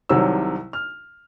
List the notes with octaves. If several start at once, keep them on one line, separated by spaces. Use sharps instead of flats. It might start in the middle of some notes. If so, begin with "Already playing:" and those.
C2 C3 D#3 F#3 E6
F6